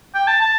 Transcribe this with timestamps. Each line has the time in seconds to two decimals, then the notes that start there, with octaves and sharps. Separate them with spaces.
0.14 G5
0.27 A5
0.41 A5